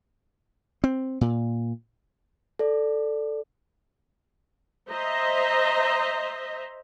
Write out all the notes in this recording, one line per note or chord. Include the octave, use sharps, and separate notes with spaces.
C4
A#2
A4 D5
C5 D#5 E5 A#5